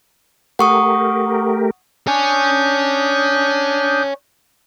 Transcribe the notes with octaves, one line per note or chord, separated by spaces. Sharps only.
A3 G4 A#4 F#5 C#6 D#6
D4 C#5 G#5 D#6 G6